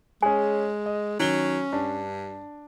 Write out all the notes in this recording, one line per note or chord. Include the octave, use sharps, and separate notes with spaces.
G#3 C#4 G#4 G#5
D#5
D#3 F#3 C#4 G7
G2 D4